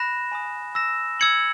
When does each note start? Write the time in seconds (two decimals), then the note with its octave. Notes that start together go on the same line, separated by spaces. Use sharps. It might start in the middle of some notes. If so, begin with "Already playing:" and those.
Already playing: B5 F#6 A#6 E7
0.32 G#5 B5 D#6
0.75 E6 A#6 E7
1.20 E6 G#6 C#7 F#7